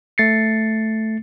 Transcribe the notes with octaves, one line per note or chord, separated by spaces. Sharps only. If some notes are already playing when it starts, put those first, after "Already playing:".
A3 A6 C7 C#7